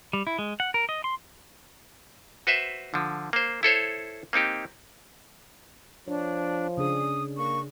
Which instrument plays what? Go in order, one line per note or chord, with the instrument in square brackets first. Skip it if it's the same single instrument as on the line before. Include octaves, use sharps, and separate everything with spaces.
[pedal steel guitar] G3
E4
G#3
F#5
A#4
D#5
C6
[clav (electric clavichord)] F#4 B4 C5 E5
D3 F3
A#3 C5
E4 A4 C5 C#5
A#3 C4 D#4 G4
[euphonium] F3 [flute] D4 [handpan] C#5
[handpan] C#3 D4 G#4 [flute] D#6
[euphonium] A#3 [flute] C#6